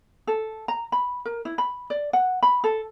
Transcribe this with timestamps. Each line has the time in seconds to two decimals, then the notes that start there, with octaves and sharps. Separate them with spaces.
0.27 A4
0.68 A#5
0.92 B5
1.25 A#4
1.45 E4
1.58 B5
1.90 D5
2.13 F#5
2.43 B5
2.64 A4